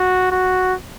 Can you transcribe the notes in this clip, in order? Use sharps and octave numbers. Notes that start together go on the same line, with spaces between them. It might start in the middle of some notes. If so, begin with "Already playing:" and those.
Already playing: F#4
F#4